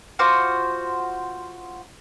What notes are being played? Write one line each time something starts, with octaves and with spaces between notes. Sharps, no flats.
F4 F#4 C5 D6